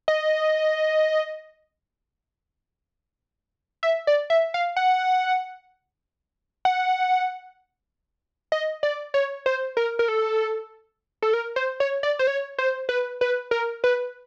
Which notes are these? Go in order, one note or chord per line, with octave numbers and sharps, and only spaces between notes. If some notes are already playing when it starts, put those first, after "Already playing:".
D#5
E5
D5
E5
F5
F#5
F#5
D#5
D5
C#5
C5
A#4
A#4
A4
A4
A#4
C5
C#5
D5
C5
C#5
C5
B4
B4
A#4
B4